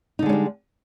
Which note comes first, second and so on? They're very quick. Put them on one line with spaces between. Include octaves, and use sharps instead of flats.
D#4 D3 G#3 C#4 G3